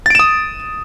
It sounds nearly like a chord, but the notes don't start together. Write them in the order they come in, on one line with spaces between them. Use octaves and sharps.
A6 D7 E7 D#6